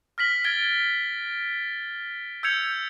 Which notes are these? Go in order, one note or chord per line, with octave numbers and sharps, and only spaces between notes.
F6 A#6 B6 F#7
F6 G#6 A6 D7 G7
E6 G6 G#6 C#7 F7